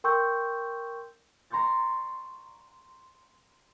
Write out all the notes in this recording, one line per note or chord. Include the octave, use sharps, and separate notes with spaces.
A#4 G5 C6 C#6 E6 G6
A#5 C6 C#6 G6 A6